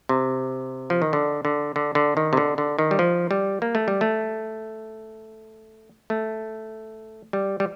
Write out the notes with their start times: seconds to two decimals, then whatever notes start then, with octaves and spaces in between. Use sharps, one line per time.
0.09 C3
0.90 F3
1.02 D#3
1.13 D3
1.45 D3
1.76 D3
1.95 D3
2.17 D#3
2.33 C3
2.37 D3
2.58 D3
2.78 D#3
2.91 G3
2.99 F3
3.31 G3
3.62 A#3
3.75 A3
3.88 G3
4.01 A3
6.10 A3
7.33 G3
7.60 G3